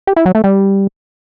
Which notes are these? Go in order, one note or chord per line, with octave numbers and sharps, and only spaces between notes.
G4
E4
F#3
A3
G3